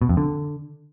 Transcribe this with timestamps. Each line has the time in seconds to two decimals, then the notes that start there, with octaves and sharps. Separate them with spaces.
0.02 B2
0.09 F2
0.17 D3